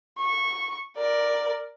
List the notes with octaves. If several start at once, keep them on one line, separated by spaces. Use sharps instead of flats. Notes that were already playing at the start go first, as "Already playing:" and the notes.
C#6
A#4 D5